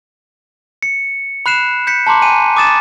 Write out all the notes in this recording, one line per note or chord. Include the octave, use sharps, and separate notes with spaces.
C#7
B5 F#6 C7 E7
G6 B6 C#7
A5 A#5 C6 D6
G#5 D#7
D6 D#6 A6 E7